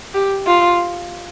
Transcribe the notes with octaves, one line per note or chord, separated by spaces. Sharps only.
G4
F4